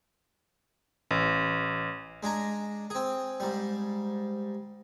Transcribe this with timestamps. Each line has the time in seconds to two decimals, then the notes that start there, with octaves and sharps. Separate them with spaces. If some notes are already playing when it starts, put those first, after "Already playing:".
1.11 A1
2.23 G#3 D4 G#5 A#5
2.90 C4 G#4
3.40 G#2 G3